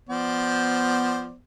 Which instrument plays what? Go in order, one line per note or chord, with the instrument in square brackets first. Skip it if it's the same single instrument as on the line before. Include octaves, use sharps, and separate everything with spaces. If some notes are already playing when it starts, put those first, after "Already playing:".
[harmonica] F3 C5 D5 [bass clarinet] B3